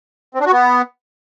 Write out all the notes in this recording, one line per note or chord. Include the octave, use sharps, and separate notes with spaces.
C4
D4
F#4
B3